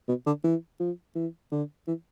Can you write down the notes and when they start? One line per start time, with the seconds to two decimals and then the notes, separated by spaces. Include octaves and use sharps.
0.08 B2
0.26 D3
0.44 E3
0.80 F3
1.16 E3
1.52 D3
1.88 E3